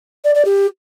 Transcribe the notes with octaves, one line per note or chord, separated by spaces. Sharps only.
D5
D5
G4